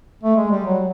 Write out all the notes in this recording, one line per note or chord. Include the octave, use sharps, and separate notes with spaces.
A3
G#3
G3
F#3